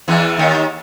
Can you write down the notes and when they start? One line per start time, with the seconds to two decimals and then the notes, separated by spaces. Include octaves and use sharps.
0.08 E2 E3
0.38 D#2 D#3